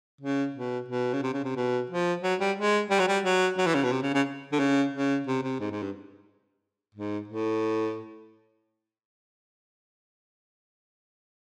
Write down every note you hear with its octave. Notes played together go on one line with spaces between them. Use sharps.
C#3
B2
B2
C#3
C3
C#3
C3
B2
F3
F#3
G3
G#3
G3
F#3
G3
F#3
F#3
E3
C#3
B2
C3
C#3
C#3
D3
C#3
C#3
C3
C3
G#2
G#2
G2
G#2
A2